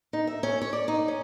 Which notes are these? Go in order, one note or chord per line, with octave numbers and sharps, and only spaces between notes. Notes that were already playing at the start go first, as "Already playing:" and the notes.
D#4
E5
C#4
C#5
D5
D#4
C#4